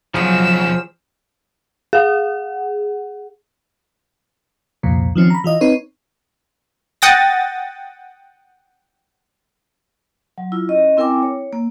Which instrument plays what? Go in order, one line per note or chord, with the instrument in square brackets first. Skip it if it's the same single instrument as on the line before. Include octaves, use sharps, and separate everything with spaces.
[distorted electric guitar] B1 C#3 [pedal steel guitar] F3 G#4 [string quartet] F#3 E6
[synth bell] G#4 F#5
[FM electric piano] C2 F2 A#2
D#3 F3 C4 C#4
A#5 B5
E3 F4 D#5
C4 D#4 B4 C#5
[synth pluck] F#5 G5 D#6 A6 A#6
[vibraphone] F#3
E4 F4
C#4 D#5
C4 E4 A#4 G5 G#5 D6
C#5
A#3